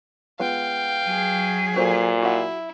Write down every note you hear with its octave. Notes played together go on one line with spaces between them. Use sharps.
G#3 B3 F4 F5 G5
F#3 G#4
A#2 F#4 A4 C5
E4 F#4 F#5